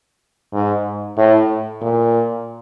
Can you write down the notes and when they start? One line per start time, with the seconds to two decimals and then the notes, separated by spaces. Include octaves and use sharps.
0.53 G#2
1.17 A2
1.81 A#2